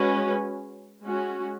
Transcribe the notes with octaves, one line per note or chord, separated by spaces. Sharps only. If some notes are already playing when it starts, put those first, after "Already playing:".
Already playing: G#3 C#4 F#4 B4
G#3 C#4 F#4